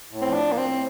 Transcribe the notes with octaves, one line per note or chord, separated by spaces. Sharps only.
A2
C4
F3
D4
A2
A#3
C4
A2